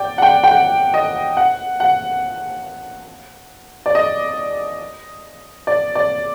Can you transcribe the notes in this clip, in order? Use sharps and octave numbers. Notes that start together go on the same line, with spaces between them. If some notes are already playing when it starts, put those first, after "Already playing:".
Already playing: D5 G5
F#5
G5
G5
F#5
D#5
F#5
F#5
D5
D#5
D5
D5